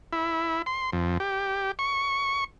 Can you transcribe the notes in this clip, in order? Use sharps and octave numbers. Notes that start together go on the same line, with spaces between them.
E4
C6
F2
G4
C#6